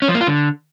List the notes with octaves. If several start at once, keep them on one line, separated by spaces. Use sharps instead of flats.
C#4
F3
A#3
F4
D3